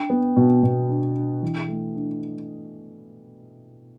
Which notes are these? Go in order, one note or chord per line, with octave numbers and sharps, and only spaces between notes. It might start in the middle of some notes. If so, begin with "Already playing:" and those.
Already playing: D4 G5
B3
B2
B2
D4
D4
E3
A3
D4